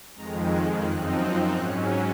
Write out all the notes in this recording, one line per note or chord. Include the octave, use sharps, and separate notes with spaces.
F2 D#3 G#3 A#5
F#6
F#2 F3 C4 D#4 F#6
F#6
G#2 F#3 C#4 F#6